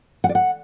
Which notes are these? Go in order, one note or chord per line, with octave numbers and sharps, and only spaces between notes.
F#5
D5
F#5